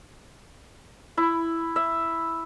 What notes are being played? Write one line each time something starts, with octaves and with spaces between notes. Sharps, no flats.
E4
E5